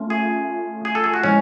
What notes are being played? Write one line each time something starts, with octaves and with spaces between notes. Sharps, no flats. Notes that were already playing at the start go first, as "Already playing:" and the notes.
Already playing: A3 C#4 F4
G#4
G#4
A4
G#4
F#4
A2 F3 G#3 C#4